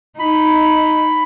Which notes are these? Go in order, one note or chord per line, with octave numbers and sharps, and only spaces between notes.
D#4 B5